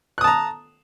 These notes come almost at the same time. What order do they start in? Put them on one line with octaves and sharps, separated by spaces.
F#6 D#6 A5 A#5